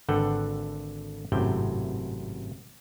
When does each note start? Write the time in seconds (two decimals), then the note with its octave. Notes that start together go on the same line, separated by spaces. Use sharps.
0.09 G#1 D3 A4 B4 F#5 G5
1.32 G#1 F#2 A2 C3 G5